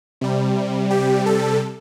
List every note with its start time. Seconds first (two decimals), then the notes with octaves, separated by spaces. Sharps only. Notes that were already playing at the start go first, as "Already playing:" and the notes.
0.21 C3 G3
0.90 G4
1.26 A4